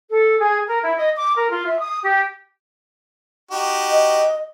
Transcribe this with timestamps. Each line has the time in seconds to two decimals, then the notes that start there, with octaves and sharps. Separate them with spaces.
0.09 A4
0.39 G#4
0.67 A#4
0.82 E4
0.96 D#5
1.16 D6
1.35 A#4
1.50 F4
1.67 E5
1.78 D#6
2.02 G4
3.51 D#4 F#4 G4
3.91 D#5